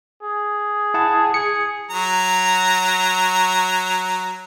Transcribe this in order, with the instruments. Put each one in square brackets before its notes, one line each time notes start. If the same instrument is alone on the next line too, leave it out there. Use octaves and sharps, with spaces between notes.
[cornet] G#4
[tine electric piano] E4 F#5 A5
[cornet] G#4 [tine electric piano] C#7
[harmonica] F#3 A#5